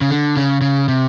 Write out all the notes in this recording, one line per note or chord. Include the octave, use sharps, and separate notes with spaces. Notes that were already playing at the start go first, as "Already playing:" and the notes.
C#3
D3
C#3
C#3
C3